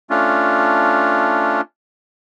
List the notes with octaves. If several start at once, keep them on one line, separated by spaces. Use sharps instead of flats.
A3 C#4 D4 F4